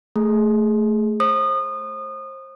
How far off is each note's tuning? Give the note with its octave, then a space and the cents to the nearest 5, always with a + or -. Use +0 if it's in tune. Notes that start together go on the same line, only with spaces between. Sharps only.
A3 +0 G#4 +0
C5 +35 D#6 -30